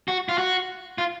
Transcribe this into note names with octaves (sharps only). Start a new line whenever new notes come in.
F#4
F4
F#4
F4